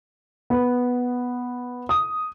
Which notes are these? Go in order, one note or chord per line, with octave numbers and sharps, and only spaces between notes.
B3
D#6